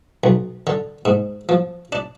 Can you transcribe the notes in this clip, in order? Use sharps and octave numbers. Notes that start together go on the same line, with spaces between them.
B1
D3
G#2
F3
D4